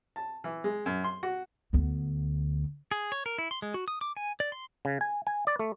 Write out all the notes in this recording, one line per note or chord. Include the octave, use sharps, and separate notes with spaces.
A5
E3
G#3
F#2
C6
F#4
D2 B3
G#4
C#5
A#4
E4
C6
G#3
F#4
D#6
D6
G#5
D5
C6
C#3
G#5
G#5
D5
A3